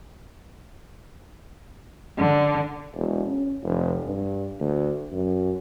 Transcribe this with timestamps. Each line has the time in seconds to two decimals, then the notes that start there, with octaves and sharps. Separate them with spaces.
2.17 D3
2.94 E1
3.27 C#4
3.63 F1
4.05 G2
4.60 D2
5.12 F#2